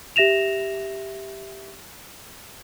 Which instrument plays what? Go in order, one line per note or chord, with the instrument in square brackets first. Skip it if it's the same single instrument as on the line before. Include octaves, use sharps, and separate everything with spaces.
[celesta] G4 E5 A#6 E7 F7